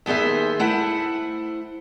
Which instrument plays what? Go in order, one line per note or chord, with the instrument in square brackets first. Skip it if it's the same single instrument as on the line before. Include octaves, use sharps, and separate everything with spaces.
[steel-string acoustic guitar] D#2 B3 G#4 C5 E5
A3 E4 C5 F#5